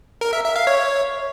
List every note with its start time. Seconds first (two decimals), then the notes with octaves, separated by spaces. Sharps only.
0.21 A#4
0.33 E5
0.44 E5
0.56 F5
0.67 C#5